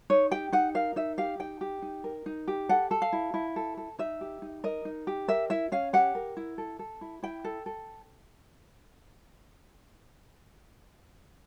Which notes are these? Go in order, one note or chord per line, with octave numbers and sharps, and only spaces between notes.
D#4 C#5
G4 G5
D#4 F#5
A#4 F5
D#4 E5
G4 F5
D#4 G5
G4
D#4
A#4
D#4
G4
A4 F#5
A4
F5
E4
E4
A4
A4
D#4 E5
G4
D#4
A#4 D#5
D#4
G4
A#4 E5
E4 E5
C#4 F5
G4 F#5
A#4
E4
A4
A4
E4
E4 G5
A4
A4